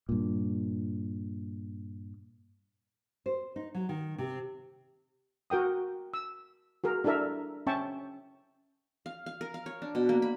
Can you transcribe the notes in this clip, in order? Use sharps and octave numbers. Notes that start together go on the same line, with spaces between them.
G2 A#2
C5
D#4
F#3
D#3
C3
F#4 A#4 G5 D#6
E6
F#4 G#4 A#4
D4 E4 A4 A#4 E5
C#4 E5 G5 A5 C#6
F5
F5
A#4
F5
C#5
D4
B2
A#3
B5